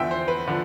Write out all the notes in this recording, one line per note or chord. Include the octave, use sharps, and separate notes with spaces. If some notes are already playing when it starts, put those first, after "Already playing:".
Already playing: E2 D3 F3 E5 G5
C5
B4
D3 F3